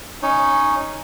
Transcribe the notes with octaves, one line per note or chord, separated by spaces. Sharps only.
C#4 D#4 C#5